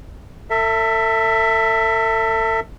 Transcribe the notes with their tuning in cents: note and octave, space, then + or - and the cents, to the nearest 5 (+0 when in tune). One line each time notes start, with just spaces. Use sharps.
A4 +35 E5 +0